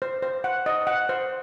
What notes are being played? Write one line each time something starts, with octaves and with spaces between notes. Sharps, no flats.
C5
C5
F#5
D#5
F#5
C5